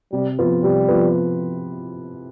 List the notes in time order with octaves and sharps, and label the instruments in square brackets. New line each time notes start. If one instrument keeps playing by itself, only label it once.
[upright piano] C3 [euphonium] G3
[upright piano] F3 B3 F4 B4
[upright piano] C3 [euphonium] G3
[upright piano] F3 B3 F4 B4